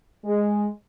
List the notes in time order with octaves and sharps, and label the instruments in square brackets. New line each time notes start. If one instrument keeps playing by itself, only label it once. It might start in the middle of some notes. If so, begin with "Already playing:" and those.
[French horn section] G#3